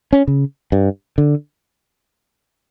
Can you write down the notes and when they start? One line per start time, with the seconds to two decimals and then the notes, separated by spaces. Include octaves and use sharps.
0.13 C#4
0.28 C#3
0.72 G2
1.18 D3